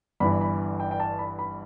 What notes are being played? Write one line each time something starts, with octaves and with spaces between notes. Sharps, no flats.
G1 G2 E3 B5
B5
G5
G5
A5
B5
B5